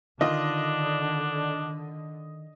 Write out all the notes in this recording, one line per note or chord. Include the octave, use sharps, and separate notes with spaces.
D3 D#3 D4 F4 D#5